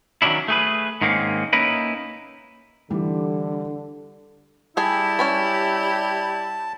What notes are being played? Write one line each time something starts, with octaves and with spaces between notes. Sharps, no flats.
D#3 F#3 G3 C#4 D4 E4
A3 G#4 B4
G#2 D#3 G#3 A#3 C4 C#4
A#3 C#4 D#4 E4 A#4 B4
D3 E3 G3
G3 E4 G4 G#4 G#5 A5
C#4 G#5 B5